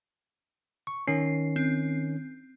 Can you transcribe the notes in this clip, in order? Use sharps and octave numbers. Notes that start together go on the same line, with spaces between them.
C#6
D#3 C#4 C7
C4